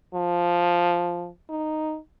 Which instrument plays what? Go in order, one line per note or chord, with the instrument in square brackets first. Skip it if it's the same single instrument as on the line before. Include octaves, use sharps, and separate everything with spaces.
[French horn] F3
D#4